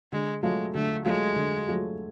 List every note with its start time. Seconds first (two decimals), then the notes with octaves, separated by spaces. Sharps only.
0.12 D3 G#3
0.43 F#3 G#3 A3 F4
0.74 D3 A3
1.05 F#3 G#3 A3 F4
1.36 D3
1.68 F#3 A3 F4